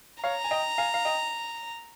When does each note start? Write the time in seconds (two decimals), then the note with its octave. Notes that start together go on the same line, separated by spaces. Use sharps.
0.23 C#5 F5 A#5
0.44 G#5
0.51 D#5 G5
0.78 F5 G#5
0.94 F5
1.05 D#5 G5